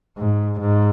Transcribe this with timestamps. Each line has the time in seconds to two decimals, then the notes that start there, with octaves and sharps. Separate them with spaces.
0.18 G#2
0.60 G#2